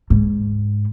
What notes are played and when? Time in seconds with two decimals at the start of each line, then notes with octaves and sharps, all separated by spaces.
0.10 G#2